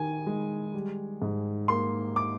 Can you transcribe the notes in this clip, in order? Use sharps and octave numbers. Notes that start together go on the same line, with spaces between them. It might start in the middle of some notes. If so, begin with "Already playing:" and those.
Already playing: D#3 G#5
G#3
G3
G#2
A#3 C6
D6